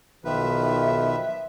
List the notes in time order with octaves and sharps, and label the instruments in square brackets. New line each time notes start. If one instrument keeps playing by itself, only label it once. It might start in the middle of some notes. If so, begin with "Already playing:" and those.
[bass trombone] B1 [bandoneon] D#3 F3 B4 [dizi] E5